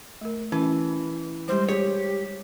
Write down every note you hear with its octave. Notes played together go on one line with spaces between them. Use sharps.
A3 A#4
E3 C#4
G3 G#3 G4 C5
G4 G#4 C#5